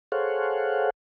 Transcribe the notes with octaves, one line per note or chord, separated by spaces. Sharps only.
G#4 A4 C5 C#5 F5 F#5